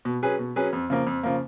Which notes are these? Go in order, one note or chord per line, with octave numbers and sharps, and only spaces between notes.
B2
F#3 C#4 G#4 B4
B2
F#3 C#4 G#4 B4
F2
C#3 F3 A#3
F2
C#3 F3 A#3